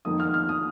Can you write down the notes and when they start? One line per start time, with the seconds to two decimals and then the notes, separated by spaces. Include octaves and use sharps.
0.05 F2 D#3 A#3 D#6
0.20 F6
0.34 F6
0.49 D#6